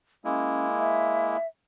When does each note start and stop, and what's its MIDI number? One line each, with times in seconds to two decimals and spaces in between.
0.25 1.37 56
0.25 1.37 58
0.25 0.68 61
0.25 1.37 64
0.78 1.47 76